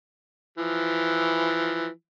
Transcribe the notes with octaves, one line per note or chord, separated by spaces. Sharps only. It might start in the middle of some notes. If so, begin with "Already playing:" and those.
E3 F3